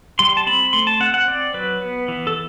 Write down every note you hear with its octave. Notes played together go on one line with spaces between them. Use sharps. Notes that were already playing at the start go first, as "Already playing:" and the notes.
G3 C6
A5
C4 B5
A3 C6
A5
C4 F#5
F#5
C4 D5
F#3 B4
B3
E3
A4